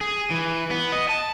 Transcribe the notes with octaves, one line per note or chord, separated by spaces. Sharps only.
G#4
E3
B3
D#5
A5